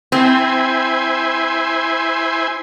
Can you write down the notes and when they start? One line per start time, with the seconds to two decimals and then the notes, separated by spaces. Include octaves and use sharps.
0.12 C4 E4 C5 G#5